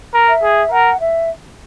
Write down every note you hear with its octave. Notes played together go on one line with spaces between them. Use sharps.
A#4
E5
G#4
A#4 F#5
E5